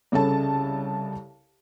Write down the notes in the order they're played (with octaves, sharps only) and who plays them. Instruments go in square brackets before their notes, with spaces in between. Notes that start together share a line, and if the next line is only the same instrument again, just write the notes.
[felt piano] C2 C#3 A4 C#5 A5